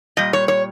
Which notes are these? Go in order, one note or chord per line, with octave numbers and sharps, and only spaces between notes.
A#2 G3 D#5
C#5
C#5